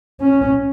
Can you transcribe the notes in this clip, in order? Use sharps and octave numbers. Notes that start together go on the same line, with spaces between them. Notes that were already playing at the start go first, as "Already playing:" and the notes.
C#4